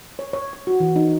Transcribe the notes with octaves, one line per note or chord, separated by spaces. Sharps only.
C#5
C#5
C#5
F#4
E3
D#4